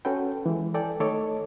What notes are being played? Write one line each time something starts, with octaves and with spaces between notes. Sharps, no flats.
C#4 F#4 A4 B4 G5
E3 G#3
A4 D5 G5 G#5
D#3 A3 A4 C#5 D#5 D6